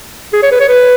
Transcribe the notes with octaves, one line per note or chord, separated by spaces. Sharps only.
G#4
C#5
B4
C#5
B4